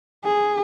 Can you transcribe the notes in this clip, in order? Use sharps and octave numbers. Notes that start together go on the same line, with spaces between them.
G#4